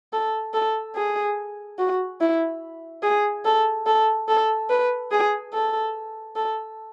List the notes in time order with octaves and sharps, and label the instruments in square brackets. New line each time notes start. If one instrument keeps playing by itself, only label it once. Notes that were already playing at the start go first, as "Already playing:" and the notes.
[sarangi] A4
A4
G#4
F#4
E4
G#4
A4
A4
A4
B4
G#4
A4
A4